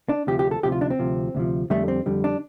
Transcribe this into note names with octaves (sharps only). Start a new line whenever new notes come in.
D4
D2 C3 F3 G4
G4
A4
D2 C3 F3 G4
F4
D4
C4
D2 C3 F3
D2 C3 F3
F2 D3 G3 A3
C4
F2 D3 G3
D4